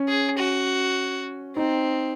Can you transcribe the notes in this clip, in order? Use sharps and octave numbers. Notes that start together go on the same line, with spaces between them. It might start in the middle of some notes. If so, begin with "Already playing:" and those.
Already playing: C#4
G#4
F#4
C4 D#4